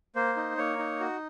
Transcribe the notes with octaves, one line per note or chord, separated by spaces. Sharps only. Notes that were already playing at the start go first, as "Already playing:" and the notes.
A#3 C5
D#4
A#3 C#5
D#4
F#4